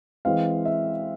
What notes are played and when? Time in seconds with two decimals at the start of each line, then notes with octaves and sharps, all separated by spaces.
0.25 E3 G#3 C4 F5
0.65 E5